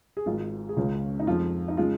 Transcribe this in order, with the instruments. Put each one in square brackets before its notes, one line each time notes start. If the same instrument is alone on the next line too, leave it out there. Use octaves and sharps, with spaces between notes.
[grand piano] G#4
G#1 G#2 G#3 F4
G#4
C#2 C#3 G#3 C#4 F4
D#4
F2 F3 G#3 F4
D#4
C#3 G#3 F4